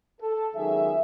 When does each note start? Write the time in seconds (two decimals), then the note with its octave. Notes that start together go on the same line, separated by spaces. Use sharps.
0.21 A4
0.56 C#2 D#3 F#3 G#4 E5